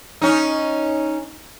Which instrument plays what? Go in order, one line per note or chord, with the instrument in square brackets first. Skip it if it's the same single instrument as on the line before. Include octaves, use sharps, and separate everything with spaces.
[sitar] C#4 D#4